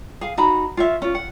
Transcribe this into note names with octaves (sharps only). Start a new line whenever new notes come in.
G#4 F5
D#4 F#4 A#5 B5
F4 C#5 E5
C#4 F4
F#5